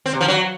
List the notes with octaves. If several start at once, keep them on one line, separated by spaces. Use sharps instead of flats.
C4
C3
F3
F#3